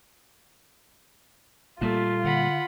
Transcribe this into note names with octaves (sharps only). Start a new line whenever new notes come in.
A#2 G3 A3 A#3 F4
D3 F#5 B5